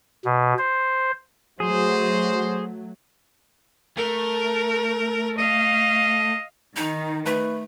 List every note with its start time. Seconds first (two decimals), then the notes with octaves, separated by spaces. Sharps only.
0.25 B2
0.58 C5
1.60 F#3 A3 F#4 G#4 C5
3.97 A3 A#4
5.38 D#5 F5
6.76 D#3 D#4
7.26 A3 B4